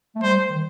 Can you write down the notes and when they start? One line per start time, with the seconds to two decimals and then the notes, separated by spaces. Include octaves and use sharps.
0.15 A3
0.22 G3 C5
0.49 D#3